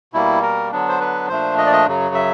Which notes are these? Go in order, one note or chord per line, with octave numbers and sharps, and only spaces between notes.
B2 G3 A#3 E4
A#4
D3 F#3 B3 D4
C5
B4
A#2 F3 A3 D4 C5
D#5
D5
D#5
F#2 C#3 F#3
E5